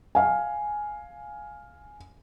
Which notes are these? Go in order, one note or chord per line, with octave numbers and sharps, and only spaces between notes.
F5 G#5